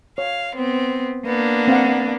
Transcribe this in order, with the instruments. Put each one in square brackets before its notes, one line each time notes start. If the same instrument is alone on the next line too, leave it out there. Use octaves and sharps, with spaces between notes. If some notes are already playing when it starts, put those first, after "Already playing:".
[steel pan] C#5 [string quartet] F5
[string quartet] B3 C4
A#3 B3 D4
[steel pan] C4 F5 F#5